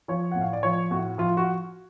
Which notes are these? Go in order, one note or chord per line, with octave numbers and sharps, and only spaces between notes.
F3 C#5
A2 F#5
F5
D5
F3 C#5
A2 F#4
F3 F4
F#4